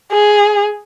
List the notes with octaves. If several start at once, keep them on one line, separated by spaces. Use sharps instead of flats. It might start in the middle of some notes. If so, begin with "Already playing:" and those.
G#4